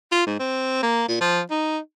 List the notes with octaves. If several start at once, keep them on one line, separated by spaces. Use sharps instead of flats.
F4
G#2
C4
A#3
A#2
F3
D#4